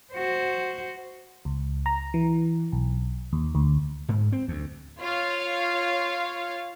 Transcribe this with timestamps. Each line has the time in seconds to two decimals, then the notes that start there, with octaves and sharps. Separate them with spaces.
0.13 F#4 C5
1.45 C#2
1.86 A#5
2.14 E3
2.72 B1
3.33 D#2
3.55 D2
4.09 G#2
4.32 C4
4.48 D2
4.99 F4 C#5 F5